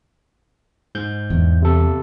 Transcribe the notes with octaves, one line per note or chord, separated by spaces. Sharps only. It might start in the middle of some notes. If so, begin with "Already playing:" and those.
G#2 G6
E2
C3 A4